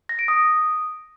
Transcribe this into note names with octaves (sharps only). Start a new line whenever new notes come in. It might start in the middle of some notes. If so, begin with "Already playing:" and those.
A#6
D7
D#6